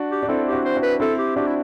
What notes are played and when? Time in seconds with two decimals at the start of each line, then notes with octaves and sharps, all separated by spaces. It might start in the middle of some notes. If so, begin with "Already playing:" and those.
Already playing: D4 F#4
0.11 G4
0.23 D4
0.28 C4 E4 A4
0.47 G4
0.53 D4 F#4
0.65 C5
0.76 D4 F#4
0.83 B4
1.00 C4 E4 A4
1.19 G4
1.36 D4 F#4 G4
1.47 E4